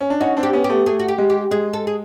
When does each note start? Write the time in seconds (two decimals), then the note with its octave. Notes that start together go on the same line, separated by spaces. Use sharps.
0.01 C#4
0.10 D4
0.20 C#4 D#4 F#4
0.37 C4 D4
0.43 G4
0.53 B3 C#4
0.64 G4
0.69 A3 B3
0.86 A3 G#4
1.00 F#4
1.08 G4
1.18 G#3
1.30 G4
1.51 G#3 G#4
1.73 A4
1.87 G#4